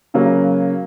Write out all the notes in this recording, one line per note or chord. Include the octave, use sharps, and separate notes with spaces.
C#3 F#3 A#3